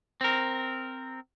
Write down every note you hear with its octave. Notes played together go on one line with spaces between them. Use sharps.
C4 A#4